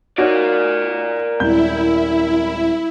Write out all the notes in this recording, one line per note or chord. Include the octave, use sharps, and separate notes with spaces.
D#4 F#4 A#4 C#5 D5
D#1 G#1 E4 G6